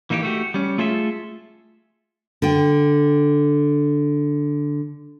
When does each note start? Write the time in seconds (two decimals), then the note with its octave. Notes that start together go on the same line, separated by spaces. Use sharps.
0.10 E3 A#3 D#4 F#4 G4
0.23 A3 F#4 G4
0.54 G3 C#4
0.78 A3 F4 G#4 A4 E5
2.42 D3 G5